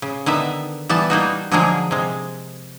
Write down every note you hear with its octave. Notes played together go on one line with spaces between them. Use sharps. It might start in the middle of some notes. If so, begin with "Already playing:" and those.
C#3
D3 D#3 B3 E5
E3 G3 B3 A5
G3 A#3 D#4 F#4
D3 F3 F#3 G#3 A#3 G#4
C3 G#3